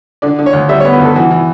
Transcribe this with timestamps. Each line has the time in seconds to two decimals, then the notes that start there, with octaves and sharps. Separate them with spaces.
0.22 D3 D5
0.39 D3
0.46 C#5
0.53 D2
0.69 G3 E5
0.80 C#5
0.85 B3
0.93 B4
1.00 D2 A4
1.15 E3 F#4
1.31 E3